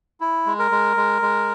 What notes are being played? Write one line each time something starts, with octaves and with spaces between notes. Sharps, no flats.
E4
G#3
A#4
G#3
G#3
G#3